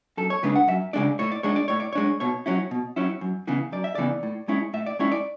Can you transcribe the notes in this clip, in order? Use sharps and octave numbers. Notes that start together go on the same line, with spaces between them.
F#2 A4
C#5
C#3 G#3 D4 B4
F#5
F#2 E5
C#3 G#3 D4 D5
A2 C#5
D5
G#3 D4 C#5
D5
A2 C#5
D5
G#3 D4 C#5
B2 C#5
F#3 C#4 E4
B2
F#3 C#4 E4
F#2
C#3 E3 B3
F#2 D5
E5
C#3 E3 B3 D5
A2
G#3 C#4 E4
A2 E5
D5
G#3 C#4 E4 C#5
D5